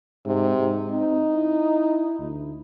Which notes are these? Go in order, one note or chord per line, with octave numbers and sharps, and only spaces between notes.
G#2 C3
G#2
C4 D#4
E4
D2